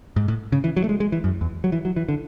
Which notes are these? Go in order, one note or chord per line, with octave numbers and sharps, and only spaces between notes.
G#2
A2
C#3
E3
F#3
A3
G#3
G#3
E3
F#2
E2
F#3
E3
F#3
E3
D3